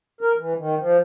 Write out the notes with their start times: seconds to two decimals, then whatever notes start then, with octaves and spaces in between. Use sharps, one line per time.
0.21 A#4
0.36 E3
0.58 D#3
0.79 F3